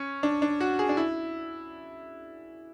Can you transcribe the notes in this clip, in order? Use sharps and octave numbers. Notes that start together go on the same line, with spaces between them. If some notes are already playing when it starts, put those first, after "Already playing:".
Already playing: C#4
D4
D4
F#4
G#4
D4
E4